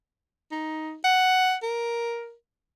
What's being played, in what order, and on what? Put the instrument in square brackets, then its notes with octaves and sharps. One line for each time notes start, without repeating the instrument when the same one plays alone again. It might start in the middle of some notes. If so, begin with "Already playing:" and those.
[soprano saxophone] D#4
F#5
A#4